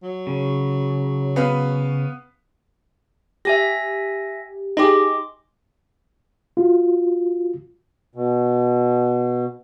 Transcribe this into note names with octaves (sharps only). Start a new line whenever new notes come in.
F#3
C#3
B3 B4 F5
G4 E5 G#5 A#6
D#4 G4 G#4 D#5 C6 D6
F4 F#4
B2